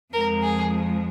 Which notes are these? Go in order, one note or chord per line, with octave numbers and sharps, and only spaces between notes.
F2 F3 G#3 A#4
G#4